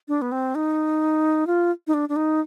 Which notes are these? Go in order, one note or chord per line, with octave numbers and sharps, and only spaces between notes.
D4
B3
C4
D#4
F4
D#4
D4
D4
D#4